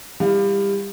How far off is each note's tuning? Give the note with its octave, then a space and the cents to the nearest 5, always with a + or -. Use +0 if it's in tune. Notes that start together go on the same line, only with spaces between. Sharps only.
G3 +25 E4 +0 F5 +0